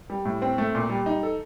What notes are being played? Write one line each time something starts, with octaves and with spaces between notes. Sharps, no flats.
G3
A2
C4
A3
A#2
G3
D#4
A4